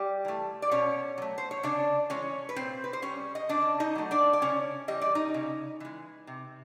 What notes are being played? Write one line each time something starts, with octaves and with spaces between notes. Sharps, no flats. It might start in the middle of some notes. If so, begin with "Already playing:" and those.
Already playing: G3 G4
E3 A3
D5
B2 C#4 C#5
F#3 A3
C5
C#5
C#3 D4 D5
E3 G#3 C#4 C#5
B4
A#2 C4 C5
B4
C5
G3 C#4 C#5
D#5
C#3 D4 D5
D#4 D#5
F#3 A3
D4 D5
D5
C#3 C#4 C#5
E3 G3 D#5
D5
D#4 D#5
C#3
E3 G#3
C3